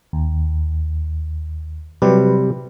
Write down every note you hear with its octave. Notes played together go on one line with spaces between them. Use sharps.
D#2
C3 F#3 G3 B4